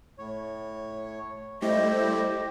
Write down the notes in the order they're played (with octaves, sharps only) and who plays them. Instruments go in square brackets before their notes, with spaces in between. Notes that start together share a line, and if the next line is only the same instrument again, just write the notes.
[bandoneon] A2 C#5
[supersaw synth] G3 A3 E4 [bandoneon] G4 [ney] C5 [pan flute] D#5